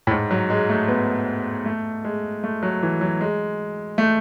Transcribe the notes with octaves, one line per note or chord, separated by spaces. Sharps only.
A2
G#2
F#3
G#3
A3
B3
A3
G#3
A3
F#3
E3
F#3
G#3
A3